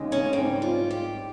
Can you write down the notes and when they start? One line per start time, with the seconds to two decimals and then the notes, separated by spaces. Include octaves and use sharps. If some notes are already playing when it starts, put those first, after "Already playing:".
Already playing: D#2 C#3 G#3
0.12 C#4
0.33 G#2 G3 C4
0.62 F4
0.91 G4